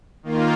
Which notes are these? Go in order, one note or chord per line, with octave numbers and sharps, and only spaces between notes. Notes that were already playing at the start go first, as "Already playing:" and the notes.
D#3 A#3 F4